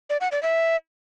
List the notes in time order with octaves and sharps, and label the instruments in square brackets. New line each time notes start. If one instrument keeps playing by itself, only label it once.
[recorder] D5
F#5
D5
E5